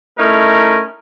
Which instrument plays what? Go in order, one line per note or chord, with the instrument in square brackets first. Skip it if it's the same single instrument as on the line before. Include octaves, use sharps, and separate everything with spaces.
[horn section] A3 C#4 D#4 E4 A#4